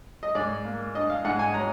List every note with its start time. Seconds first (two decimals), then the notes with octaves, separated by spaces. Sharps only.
0.23 D#5
0.35 G#2 D5
0.65 A#3
0.95 D4 D#5
1.10 F5
1.25 G#2 F#5
1.39 G#5
1.54 F#3 A#5